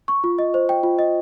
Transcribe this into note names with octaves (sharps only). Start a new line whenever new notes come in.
C#6
F4
D#5
C5
G5
F4
D#5